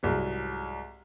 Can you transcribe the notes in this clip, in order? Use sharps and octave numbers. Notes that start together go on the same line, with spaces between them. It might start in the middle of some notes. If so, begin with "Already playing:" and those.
C2 G#2 F#3